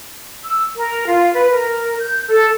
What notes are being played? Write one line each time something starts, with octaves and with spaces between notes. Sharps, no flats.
E6
A#4
F4
B4
A#4
G6
A4